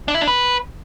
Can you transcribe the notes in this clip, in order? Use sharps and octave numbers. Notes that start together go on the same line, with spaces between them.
D4
E4
D4
B4